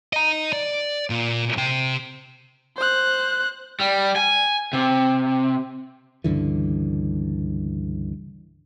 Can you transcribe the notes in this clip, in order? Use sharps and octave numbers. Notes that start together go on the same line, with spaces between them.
D#5 A#5
D5
A#2
C3 G5
C5 F#6
G3
G#5
C3
C#2 G2 D3 E3